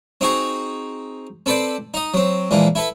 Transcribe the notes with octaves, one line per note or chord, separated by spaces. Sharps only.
C4 D#4 F#4 G#4
C4 A4 B4 C5 D5
D#4 D#5
F#3 C4
A#2 E3 F3 G#3
E4 A4 B4